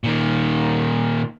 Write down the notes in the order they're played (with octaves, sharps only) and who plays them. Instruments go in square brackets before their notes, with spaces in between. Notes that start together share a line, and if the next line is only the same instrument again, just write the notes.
[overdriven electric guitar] A#2 D#3